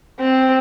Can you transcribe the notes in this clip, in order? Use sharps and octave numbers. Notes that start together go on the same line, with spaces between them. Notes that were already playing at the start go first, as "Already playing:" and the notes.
C4